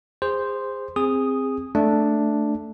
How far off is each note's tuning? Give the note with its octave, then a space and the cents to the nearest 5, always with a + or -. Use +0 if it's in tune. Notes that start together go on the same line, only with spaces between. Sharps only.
G#4 -30 C5 -5
C4 +0 G#4 -20 D#6 +0
A3 +0 D4 +0